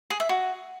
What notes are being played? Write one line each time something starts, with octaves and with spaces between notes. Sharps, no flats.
G#4
E5
F#4